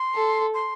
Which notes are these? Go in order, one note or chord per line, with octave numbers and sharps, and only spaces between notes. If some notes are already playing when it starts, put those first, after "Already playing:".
Already playing: C6
A4
C6